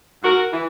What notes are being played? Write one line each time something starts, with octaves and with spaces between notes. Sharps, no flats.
G#2 F#4 A#4
E3